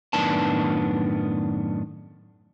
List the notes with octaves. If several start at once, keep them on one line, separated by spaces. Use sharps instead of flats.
F#2 A2 D#3 B3 D4 A5